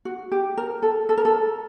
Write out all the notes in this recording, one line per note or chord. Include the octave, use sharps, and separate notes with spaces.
F#4
G4
A#4
A4
A4
A#4
A4